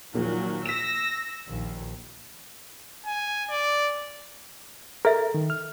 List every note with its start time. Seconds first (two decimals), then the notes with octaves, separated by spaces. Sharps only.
0.14 D#2 A#2 F3 F#3
0.66 E6 A#6 B6 E7
1.47 A#1 D#2
3.06 G#5
3.50 D5
5.05 A4 A#4 E5
5.35 D#3
5.50 F6